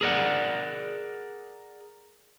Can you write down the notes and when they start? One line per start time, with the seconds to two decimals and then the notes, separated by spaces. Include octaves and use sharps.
0.01 G#4 A#4 D5 F#5